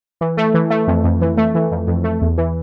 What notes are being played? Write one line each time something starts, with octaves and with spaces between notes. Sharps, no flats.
E3
A3
E3
A3
F2
F2
E3
A3
E3
F2
F2
A3
E2
E3